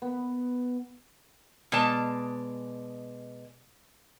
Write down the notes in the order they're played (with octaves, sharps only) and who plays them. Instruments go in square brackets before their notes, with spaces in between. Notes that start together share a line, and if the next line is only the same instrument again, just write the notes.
[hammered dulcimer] B3
[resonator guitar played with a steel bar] B2 G#3 D5 A5